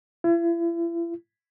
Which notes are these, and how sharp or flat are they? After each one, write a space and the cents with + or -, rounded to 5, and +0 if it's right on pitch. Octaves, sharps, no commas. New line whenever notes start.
E4 +40